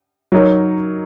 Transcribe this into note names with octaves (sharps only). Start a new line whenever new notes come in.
F#3 D#4 A#4 C#5